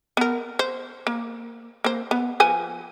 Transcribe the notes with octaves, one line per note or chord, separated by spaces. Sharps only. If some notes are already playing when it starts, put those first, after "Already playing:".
B3 A#4
C5
A#3
A#3 C5
B3
F3 B4 G#5